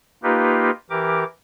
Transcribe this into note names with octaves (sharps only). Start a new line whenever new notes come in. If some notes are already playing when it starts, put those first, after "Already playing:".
A#3 D#4 F4 G4 B4
E3 G4 A#4 D6